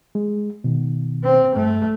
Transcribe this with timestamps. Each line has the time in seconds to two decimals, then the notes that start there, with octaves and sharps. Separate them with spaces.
0.15 G#3
0.64 B2 D#3
1.24 C4
1.56 G2 A3